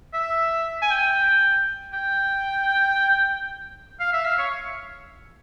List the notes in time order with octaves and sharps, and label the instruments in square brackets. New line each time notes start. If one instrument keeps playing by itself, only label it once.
[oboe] E5
G#5
G5
G5
F5
E5
F5
C#5